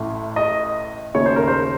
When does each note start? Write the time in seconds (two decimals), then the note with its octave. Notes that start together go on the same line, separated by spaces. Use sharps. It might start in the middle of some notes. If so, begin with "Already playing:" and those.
Already playing: A1 A2 A3
0.36 D#5
1.15 D#2 C#3 A3 C#5
1.26 C5
1.36 A#4
1.48 C5